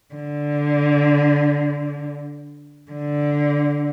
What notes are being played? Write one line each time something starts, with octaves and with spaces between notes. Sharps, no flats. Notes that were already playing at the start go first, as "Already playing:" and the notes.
D3
D3